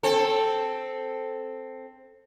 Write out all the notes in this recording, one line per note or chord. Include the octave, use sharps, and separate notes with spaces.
C4 A4